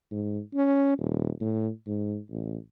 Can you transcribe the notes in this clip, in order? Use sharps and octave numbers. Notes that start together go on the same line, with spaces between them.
G#2
C#4
D#1
A2
G#2
A1